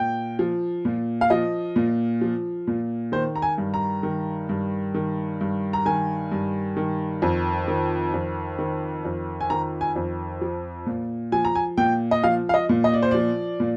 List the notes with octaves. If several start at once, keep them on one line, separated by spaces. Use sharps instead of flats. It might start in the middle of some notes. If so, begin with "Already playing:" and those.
Already playing: A#2 G5
F3
A#2
F5
F3 D#5
A#2
F3
A#2
D#3 C5
A#5
G#5
G2
A#5
D#3
G2
D#3
G2
A#5
D#3 G#5
G2
D#3
F2
D#3
F2
D#3
F2
G#5
D#3 A#5
G#5
F2
F3
A#2
F3 G#5
A#5
G#5
A#2 G5
D#5
F3 F5
F5
D#5
A#2
D#5
D5
C5
F3 D5
A#2